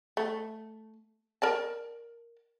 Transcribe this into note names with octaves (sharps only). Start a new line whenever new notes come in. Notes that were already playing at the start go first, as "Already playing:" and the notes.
A3
A#4 D5 A5